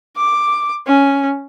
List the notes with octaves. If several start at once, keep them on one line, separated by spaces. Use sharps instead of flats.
D6
C#4